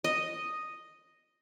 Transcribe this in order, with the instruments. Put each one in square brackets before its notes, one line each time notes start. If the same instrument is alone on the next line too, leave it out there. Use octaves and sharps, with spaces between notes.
[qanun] D#5